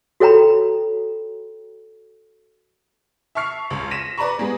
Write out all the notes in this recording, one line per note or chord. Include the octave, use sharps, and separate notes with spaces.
F#4 A4 C#5 G5 A#5 B5
E5 A5 C#6 F6 C7
C#2 C#6
A#6 B6 D#7 E7
B4 D5 A#5 B5 C#6
G3 G#3 B3